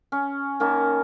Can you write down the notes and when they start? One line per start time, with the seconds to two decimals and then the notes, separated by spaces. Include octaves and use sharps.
0.12 C#4
0.60 D#3 A#3 C#4 A5